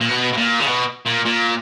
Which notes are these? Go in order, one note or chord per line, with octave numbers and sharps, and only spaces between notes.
A#2
B2
B2
A#2
C#3
B2
A#2
A#2